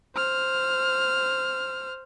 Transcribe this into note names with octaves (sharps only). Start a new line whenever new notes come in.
C5 F6